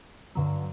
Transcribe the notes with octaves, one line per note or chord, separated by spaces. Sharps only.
G2 D3 F#3